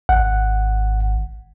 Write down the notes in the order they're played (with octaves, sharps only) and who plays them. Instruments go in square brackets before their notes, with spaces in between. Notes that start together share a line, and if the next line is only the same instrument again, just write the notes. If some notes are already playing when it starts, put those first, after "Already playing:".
[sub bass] G#1 [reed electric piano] F#5